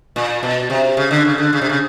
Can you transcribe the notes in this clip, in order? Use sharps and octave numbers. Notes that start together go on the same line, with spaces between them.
A#2
B2
C3
C#3
D3
C#3
D3
C#3
C3
C#3